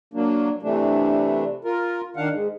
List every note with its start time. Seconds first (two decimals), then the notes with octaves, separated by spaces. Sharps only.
0.14 F#3 A#3 D4
0.63 C3 E3 A3 D4
1.65 F4 A#4
2.16 D#3 D4 F5 F#5
2.32 G#2